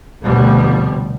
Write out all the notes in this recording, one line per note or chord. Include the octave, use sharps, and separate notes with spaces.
F1 D2 B2 F3 G3 B3